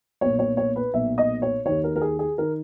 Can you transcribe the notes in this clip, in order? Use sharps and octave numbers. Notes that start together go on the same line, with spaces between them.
B1 A#2 C#5
C#5
C#5
B4
B1 A#2 E5
D#5
C#5
D#2 D#3 C#5
A#4
A#4
G#4
G#4
D#3 A#4